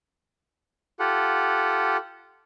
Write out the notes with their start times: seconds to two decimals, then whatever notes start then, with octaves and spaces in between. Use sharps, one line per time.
1.00 F4 G4 A4 F#5